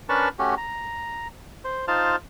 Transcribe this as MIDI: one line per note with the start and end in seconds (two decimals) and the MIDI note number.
0.09 0.28 61
0.09 0.28 62
0.09 0.28 70
0.09 0.28 71
0.09 0.28 81
0.09 0.28 85
0.39 0.54 57
0.39 0.54 61
0.39 0.54 66
0.39 0.54 67
0.57 1.28 82
1.64 1.85 72
1.88 2.16 63
1.88 2.16 65
1.88 2.16 72
1.88 2.16 81
1.88 2.16 89